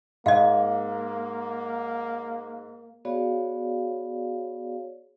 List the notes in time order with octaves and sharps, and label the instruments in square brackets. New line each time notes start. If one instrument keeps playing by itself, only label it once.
[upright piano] G#2 [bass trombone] A#3 [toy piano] D#5 F5
[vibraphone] B3 F#4 G#4 C#5 D5 F5